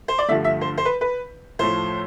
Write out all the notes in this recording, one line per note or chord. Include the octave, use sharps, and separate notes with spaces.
C5
D5
G2 D3 F3 A3 E5
E5
C5
C5
B4
B4
A2 F3 A3 C5